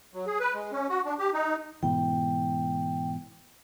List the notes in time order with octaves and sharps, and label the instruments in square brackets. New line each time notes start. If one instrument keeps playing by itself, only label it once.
[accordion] F#3
G#4
B4
G#3
C#4
F#4
D4
G4
D#4
[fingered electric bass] G#2 B2 E3 [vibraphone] G5